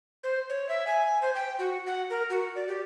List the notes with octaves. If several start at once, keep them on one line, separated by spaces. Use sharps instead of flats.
C5
C#5
E5
G#5
C5
G5
F#4
F#5
A#4
F#4
D5
G4